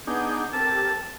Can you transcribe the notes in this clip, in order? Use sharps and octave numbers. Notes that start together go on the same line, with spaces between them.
B3 D4 D#4 G#4 G6
C4 G4 A4 A#4 A5